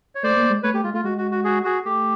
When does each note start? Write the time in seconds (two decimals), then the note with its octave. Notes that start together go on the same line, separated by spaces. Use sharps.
0.15 C#5
0.23 A3 C5 D5
0.36 A#3
0.50 G#3
0.63 A3 B4 C#5
0.74 A3 G4
0.83 G#3 F4
0.94 A3 F4
1.04 G#3 F#4
1.18 F#4
1.31 F#4
1.44 F#4 G#4
1.64 F#4 G#4
1.85 A3 G4